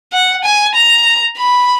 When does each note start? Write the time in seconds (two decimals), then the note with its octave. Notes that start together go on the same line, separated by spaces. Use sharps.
0.13 F#5
0.44 G#5
0.75 A#5
1.38 B5